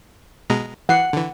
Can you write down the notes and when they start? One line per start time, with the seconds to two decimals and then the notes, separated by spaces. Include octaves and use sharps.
0.50 B2 G#3 A#5
0.89 E3 F#5 C7
1.13 D3 E3